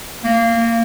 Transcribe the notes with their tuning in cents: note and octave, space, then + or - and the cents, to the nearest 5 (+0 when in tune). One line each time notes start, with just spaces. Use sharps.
A#3 -20